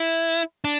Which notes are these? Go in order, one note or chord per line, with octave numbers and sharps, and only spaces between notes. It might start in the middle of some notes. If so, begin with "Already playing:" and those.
Already playing: E4
D4